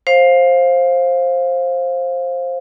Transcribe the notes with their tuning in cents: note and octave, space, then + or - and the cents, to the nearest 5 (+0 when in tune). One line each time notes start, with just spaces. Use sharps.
C5 +15 F5 +5